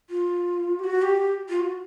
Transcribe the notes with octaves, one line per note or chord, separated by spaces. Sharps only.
F4
G4
F#4
G4
F4
F#4